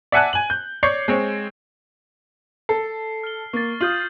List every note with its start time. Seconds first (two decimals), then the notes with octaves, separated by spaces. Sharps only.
0.12 D5 E5 F#5 G#5 A5 F#6
0.33 G#5 F#7
0.50 G6
0.83 C#5 D5 C#6 G6 G#6 C7
1.08 G#3 C4 C#5
2.69 A4 C7
3.24 F6 G7
3.53 A#3 C#6 A6
3.81 F4 D#6 G6 F#7